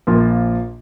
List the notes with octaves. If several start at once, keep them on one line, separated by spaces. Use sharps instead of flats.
A#1 A#2 F3 A#3 F4